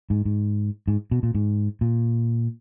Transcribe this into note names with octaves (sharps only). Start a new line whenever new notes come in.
G#2
G#2
G#2
B2
A#2
G#2
A#2